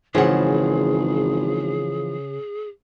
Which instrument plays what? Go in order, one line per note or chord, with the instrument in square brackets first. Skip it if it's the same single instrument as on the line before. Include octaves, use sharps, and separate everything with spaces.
[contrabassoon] G#1 [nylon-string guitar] C#3 F#5 [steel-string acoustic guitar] E3 F3 [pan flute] G#4